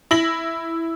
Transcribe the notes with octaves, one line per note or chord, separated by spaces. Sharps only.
E4 A#6 F#7